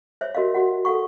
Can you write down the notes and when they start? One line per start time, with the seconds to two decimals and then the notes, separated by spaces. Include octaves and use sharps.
0.21 C5 C#5 E5
0.35 F#4 A#4 D#5 F5
0.54 F#4 F#5
0.85 A4 F5 F#5 C#6